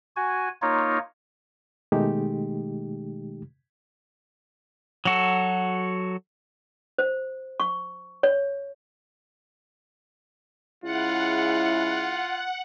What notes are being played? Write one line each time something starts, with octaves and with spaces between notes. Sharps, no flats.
F#4 G#5
A#3 D#4 F4 C#5
B2 D#3 G#3 A3 D#4 G4
F#3 F#4 A4
C5
C#6
C#5
C#3 G#3 E4 F4 F#5